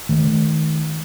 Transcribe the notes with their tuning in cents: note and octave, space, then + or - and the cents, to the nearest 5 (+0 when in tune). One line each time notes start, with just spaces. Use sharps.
D#3 +10 A3 -30